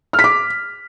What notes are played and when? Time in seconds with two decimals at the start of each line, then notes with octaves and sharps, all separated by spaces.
0.13 F6
0.19 B6
0.24 D6